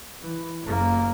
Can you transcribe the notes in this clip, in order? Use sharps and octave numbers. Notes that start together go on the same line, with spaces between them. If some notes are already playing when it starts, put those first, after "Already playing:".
E3
F#1 A#3